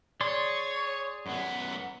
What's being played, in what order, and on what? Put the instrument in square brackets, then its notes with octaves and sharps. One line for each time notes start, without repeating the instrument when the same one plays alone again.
[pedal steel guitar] G#4 D5 C6 [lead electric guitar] C#5
[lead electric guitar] F#2 B3